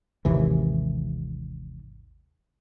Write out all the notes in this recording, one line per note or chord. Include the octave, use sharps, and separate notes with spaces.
G#1 D#2 C3 E3